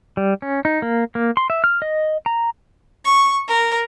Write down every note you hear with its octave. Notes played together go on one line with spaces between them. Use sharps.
G3
C#4
D#4
A#3
A#3
C6
E5
F6
D#5
A#5
C#6
A#4